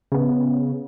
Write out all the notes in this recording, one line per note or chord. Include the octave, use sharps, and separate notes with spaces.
C#3 B3